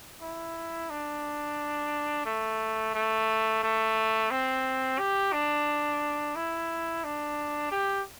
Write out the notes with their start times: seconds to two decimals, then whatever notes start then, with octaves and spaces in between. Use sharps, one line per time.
0.22 E4
0.90 D4
2.26 A3
2.95 A3
3.63 A3
4.31 C4
4.99 G4
5.33 D4
6.36 E4
7.04 D4
7.71 G4